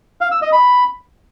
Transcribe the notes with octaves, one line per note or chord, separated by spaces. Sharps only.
F5
E6
D#5
B5